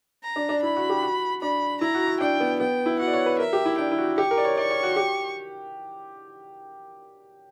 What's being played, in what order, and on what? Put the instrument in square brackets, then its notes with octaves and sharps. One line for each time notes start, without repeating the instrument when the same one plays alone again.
[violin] A#5
[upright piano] D4
D4
[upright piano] E4 [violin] B5
[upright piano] F#4
G4
F#4
[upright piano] D4 [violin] B5
[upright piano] E4 [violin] A#5
[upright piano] F#4
F#4
[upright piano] D4 [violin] G5
[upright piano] B3
[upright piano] B3 [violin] G5
[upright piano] E4
[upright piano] F#4 [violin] F#5
[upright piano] D5
C#5
B4
[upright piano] A#4 [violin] E5
[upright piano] G4
E4
[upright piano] D4 [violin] G5
[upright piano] E4
F#4
[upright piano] G4 [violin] C#6
[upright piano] A#4
D5
C#5
[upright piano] D5 [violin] C#6
[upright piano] C#5
F#4
G4